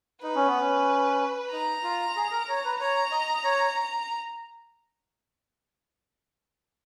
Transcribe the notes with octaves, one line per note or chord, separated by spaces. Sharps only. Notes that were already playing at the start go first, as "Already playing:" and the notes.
D#4 B4
C#4
B3
C#4
D#4 A#5
F4
G#4
A#4
C#5
B4
C#5 A#5
D#5
C#5